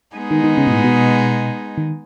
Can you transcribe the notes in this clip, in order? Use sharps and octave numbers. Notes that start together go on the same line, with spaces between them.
G#3 B3 D#4 G#4
D#3
D#3
C#3
B2
A2
B2
D#3